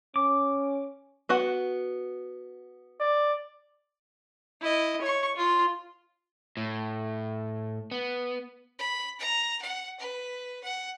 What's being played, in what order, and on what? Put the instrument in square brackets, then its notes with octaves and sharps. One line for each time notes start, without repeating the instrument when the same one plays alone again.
[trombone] C#4 [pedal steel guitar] D6
[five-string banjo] B3 F#4 F#5
[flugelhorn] D5
[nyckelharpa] E4 D#5
C#5 C#6
F4
[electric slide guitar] A2
B3
[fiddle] B5
A#5
F#5
B4
F#5